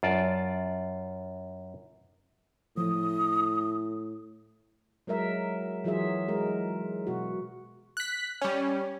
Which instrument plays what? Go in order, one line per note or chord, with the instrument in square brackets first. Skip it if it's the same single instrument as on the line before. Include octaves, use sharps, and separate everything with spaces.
[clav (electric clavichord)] F#2 F4 D5 A5
[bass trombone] A2 [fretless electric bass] F3 [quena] D#6
[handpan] F#3 G#3 A#4 E5
E3 F#3 F4 G#4 E5
G#3 A#4
B2 F#4
[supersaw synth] F#6 B6
G3 C#4